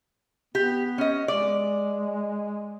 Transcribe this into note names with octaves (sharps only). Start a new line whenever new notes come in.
B3 G4
C#4 D#5
G#3 D5